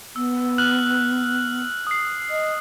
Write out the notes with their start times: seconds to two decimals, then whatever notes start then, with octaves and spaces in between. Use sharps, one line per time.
0.16 B3 E6
0.58 F6 F#6 F#7
1.87 D#6 C7
2.30 D#5